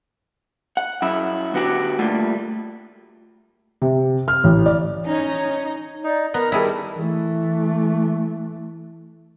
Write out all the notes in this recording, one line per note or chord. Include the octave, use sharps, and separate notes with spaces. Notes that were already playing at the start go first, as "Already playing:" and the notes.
F#5
F#2 E4
D3 B3 F#4 G4 F#5
G3 A3 A#3 F4
C3
F6
A1
D5
C#4 D#4 C#5
D#4 D5
B3 A#4 A#5
D#3 G3 E4 G#4 A4
E3 A3